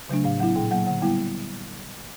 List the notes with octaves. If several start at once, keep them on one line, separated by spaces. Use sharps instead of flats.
C#3 F#3 A3 D4
A2 F5
F#3 B3 E4 F#5
A#2 G5
F#3 A#3 F#5
D3 F#5
G3 B3 E4 G5